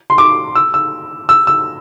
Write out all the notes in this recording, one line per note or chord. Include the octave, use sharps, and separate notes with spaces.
C6
D6
E6
E6
E6
E6